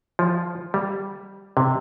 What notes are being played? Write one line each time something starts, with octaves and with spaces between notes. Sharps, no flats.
F3
G3
C3